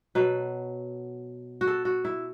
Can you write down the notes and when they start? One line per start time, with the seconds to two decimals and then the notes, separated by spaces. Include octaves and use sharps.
0.15 B2 F#3 B4
1.61 F#4
1.67 A4
1.85 F#4
2.05 E4